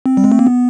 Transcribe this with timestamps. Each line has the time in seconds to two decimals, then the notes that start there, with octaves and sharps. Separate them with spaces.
0.06 C4
0.17 G3
0.24 G#3
0.32 A3
0.39 A#3
0.47 B3